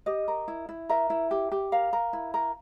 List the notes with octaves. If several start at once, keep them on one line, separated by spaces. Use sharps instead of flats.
G4 D#5
A#4
E4
E4
A#4 E5
E4
G4
G4
A#4 F5
A#4
E4
A#4